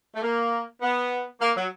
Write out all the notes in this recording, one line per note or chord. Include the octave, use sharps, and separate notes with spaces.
A3
A#3
B3
A#3
F#3